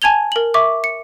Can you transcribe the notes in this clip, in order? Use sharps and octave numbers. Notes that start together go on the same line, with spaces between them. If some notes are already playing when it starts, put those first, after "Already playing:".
G#5 A5 G#6 F7 G7
A#4 F#7
E5 C#6 D6
C#7